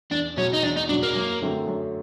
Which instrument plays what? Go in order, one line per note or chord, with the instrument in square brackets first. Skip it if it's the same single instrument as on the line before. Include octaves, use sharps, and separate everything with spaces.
[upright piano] E2 [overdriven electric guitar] D4
[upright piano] B2 F#3 [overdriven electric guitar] C#4
[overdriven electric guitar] D#4
[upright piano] E2 [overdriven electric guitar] D4
[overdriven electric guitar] D#4
[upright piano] B2 F#3 [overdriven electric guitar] D4
[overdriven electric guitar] A#3
[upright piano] F#2
D3 F#3 A3 C4
F#2